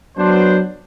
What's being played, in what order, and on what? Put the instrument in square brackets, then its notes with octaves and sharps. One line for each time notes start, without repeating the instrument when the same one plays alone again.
[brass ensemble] F#3 B3 D4 C5